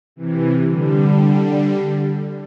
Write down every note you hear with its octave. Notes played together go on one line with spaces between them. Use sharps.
C3 E3
D3 G3